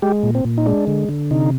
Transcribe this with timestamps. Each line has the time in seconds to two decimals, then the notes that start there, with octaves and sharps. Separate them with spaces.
0.02 G#3 G4
0.23 A#2
0.35 C4
0.45 A#2
0.58 D#4
0.66 G#3 D4
0.87 D3
1.09 D3
1.31 C3 D#4